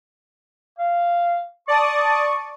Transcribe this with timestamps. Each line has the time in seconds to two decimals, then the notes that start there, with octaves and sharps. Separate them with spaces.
0.79 F5
1.68 D5 A5 C#6 D#6